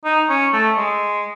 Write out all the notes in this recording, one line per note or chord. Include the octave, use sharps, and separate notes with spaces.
D#4
C#4
A3
G#3